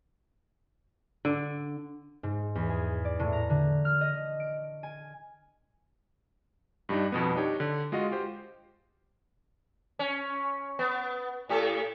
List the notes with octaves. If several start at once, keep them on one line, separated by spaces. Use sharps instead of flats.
D3
G#2
E2
G#4
D5
A2
A#5
D3
F6
D#5
D7
G#5
G2 G3 D4 D#4
F2 B2 B3
D4 D#4 G4 C#5
D3
G#3 F4 F#4 D#5
F4 G4 C5
C#4
B3
A2 G4 A4